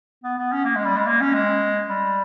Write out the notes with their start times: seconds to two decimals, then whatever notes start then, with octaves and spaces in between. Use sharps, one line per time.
0.24 B3
0.38 B3
0.52 C#4
0.65 A#3
0.76 G#3
0.86 G3
0.97 G#3
1.07 A#3
1.21 C#4
1.34 G#3
1.89 G3